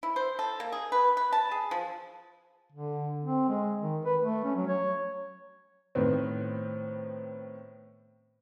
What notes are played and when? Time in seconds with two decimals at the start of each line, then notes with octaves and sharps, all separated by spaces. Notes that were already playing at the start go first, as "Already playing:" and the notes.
0.03 E4
0.16 C5
0.39 A4
0.60 A#3
0.72 G#4
0.92 B4
1.17 B4
1.32 A5
1.51 G#4
1.71 F3
2.72 D3
3.23 C4
3.49 G#3
3.82 D#3
4.06 B4
4.22 A3
4.45 C#4
4.56 F#3
4.67 C#5
5.95 A2 D#3 B3 C4